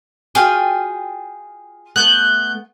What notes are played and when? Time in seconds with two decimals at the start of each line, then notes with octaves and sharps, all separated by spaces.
0.35 F4 F#4 G#4 G5 F6
1.96 A3 B3 A4 F#6 G6